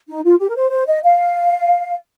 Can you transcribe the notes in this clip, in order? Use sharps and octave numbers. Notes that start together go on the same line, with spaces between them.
D#4
F4
G4
A#4
C5
C5
D#5
F5